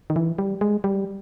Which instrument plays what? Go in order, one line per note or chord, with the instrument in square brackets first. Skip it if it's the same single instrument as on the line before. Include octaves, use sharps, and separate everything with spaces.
[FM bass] D#3
E3
G3
G#3
G3